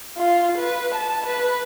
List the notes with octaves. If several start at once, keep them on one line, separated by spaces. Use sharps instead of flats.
F4
B4
A5
B4